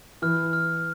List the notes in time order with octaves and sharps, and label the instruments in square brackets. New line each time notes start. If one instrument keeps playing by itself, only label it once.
[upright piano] E3 [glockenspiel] F6
[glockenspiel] F6